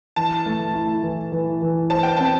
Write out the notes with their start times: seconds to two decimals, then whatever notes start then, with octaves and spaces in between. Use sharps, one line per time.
0.16 E3 A5
0.46 A3
0.74 E4
1.03 E3
1.32 E3
1.62 E3
1.90 C5 A5
2.03 G5
2.17 C4 A5